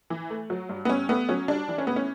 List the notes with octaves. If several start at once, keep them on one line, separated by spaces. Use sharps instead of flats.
E3
A3
F#3
G2
B3
G2 C#4
A3 B3
F#3 C#4
G3 D4
E3
C#4
A2 B3
C#4